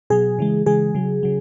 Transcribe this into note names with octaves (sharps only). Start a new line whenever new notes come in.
B2 F#3 G#4
C#3 E3 G#3
C#3 E3 G#3 G#4
C#3 F#3
C#3 F#3